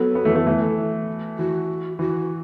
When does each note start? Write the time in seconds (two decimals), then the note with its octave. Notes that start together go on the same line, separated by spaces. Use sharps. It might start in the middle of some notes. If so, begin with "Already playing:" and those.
Already playing: F#3 B3 A4
0.15 F#3 B3
0.25 E3 A3
0.35 E3 A3
0.47 E3 A3
1.38 E3 F#4
1.99 E3 F#4